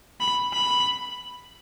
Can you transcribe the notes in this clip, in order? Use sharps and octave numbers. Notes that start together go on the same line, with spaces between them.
B5
B5